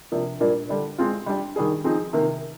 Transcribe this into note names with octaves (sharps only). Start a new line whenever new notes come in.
C3 F3 A#3 D4
A#2 G3 A#3 D4
D3 G3 D4
G#3 C4 F4
G3 D4 G4
D#3 G3 D4 G#4
F3 C4 D#4 G#4
C3 D#3 A#3